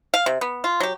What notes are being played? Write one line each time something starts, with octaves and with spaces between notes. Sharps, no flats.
F5
C3
B3
F4
F#3 G4